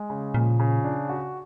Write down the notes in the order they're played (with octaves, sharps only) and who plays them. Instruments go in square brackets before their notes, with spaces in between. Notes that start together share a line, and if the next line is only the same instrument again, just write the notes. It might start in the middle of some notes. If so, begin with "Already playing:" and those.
Already playing: [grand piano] G#3
C#3
[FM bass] A#2 [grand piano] F3
[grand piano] C#3
D4
F#4